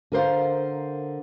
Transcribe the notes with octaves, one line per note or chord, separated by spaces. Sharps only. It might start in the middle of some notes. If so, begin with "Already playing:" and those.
D3 A#4 C5 F5